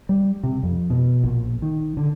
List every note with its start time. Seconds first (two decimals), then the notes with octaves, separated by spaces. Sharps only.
0.09 G3
0.43 C3
0.63 F2
0.90 B2
1.23 A#1
1.62 D#3
1.97 D3